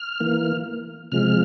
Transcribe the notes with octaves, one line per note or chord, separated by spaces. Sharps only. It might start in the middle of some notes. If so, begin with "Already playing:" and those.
Already playing: F6
E3 A#3
C3 F3 G#3 F6